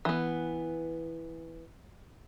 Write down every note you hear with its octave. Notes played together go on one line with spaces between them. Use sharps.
E3 B3